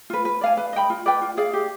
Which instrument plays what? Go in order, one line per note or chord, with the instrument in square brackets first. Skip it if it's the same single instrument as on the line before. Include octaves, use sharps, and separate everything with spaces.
[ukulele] F4 B4
B4
D5 F5 G#5
B4
D#5 G5 B5
F4
B4 D5 G5
F4
G#4 D5 F5
G4